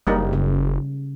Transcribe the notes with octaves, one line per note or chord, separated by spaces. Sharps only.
F#1 G3 A#3 D#4
C#3